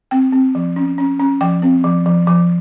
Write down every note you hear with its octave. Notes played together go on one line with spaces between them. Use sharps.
C4 G5
C4
F3
C#4
C#4
C#4
F3 G5
C4
F3
F3
F3